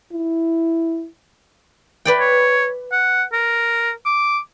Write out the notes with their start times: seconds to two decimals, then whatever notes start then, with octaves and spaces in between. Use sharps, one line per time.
0.13 E4
2.05 B4 D5 G5
2.20 C#5
2.92 F#5
3.33 A#4
4.05 D6